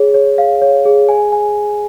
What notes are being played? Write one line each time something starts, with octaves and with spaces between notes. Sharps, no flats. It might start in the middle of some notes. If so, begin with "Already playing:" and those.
Already playing: G#4 C#5
C#5
F5
C#5
G#4
G#5
G#5